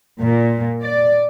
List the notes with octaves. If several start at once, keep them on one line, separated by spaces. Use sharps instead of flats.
A#2
D5